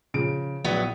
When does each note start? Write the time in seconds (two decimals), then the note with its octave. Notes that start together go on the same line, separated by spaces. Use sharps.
0.14 C#3 F3 D7
0.64 A#1 F#3 B3 E4